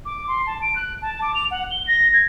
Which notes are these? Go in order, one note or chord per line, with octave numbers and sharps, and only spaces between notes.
D6
C6
A5
D7
F#6
A5
D6
F7
F#5
G7
A#6
G#6